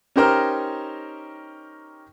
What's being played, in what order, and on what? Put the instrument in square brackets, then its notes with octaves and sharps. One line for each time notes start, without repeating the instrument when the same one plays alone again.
[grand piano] C#4 D#4 G4 A#4 C5 A#5